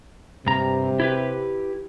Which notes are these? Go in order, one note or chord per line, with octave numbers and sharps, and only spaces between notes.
G2 C3 A#5
E4 G4 B4